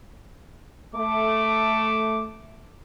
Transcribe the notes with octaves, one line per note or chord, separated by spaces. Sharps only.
A3 D6